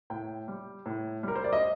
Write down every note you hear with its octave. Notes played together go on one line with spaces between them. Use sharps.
A2 G5
G3
A2
G3 A#4
C5
D5
D#5